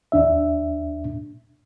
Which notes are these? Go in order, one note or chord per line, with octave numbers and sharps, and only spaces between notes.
D#2 D4 E5